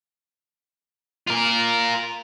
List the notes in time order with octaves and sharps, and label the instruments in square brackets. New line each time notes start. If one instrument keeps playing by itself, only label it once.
[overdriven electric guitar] F4 A#4